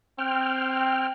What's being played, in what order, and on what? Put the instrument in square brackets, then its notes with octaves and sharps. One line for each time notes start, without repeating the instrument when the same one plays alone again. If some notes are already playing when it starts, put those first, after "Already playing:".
[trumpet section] C4 [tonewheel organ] G5 F6